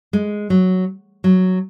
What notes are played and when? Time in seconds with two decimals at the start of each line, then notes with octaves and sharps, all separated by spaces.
0.13 G#3
0.50 F#3
1.24 F#3